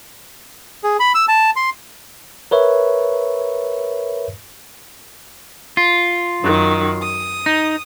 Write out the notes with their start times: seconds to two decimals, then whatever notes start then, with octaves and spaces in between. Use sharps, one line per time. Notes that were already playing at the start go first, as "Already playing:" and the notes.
0.84 G#4
1.00 B5
1.15 E6
1.28 A5
1.56 C6
2.51 A#4 B4 C#5 E5
5.77 F4
6.42 F#2 D#3 F#3
7.02 D#6
7.46 D#4